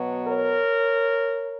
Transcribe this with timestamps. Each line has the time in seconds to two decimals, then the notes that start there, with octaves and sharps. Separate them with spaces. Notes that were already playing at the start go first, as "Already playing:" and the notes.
Already playing: B2 F#3 B3
0.26 A#4 C#5